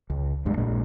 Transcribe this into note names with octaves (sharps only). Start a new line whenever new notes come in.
C#2
A1 E2 G2 G#3
A#1 A#2 G#3 D4